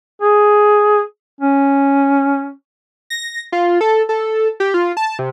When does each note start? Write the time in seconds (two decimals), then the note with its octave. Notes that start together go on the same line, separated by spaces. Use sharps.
0.21 G#4
1.40 C#4
3.10 A#6
3.52 F4
3.81 A4
4.09 A4
4.60 G4
4.74 F4
4.97 A5
5.19 C3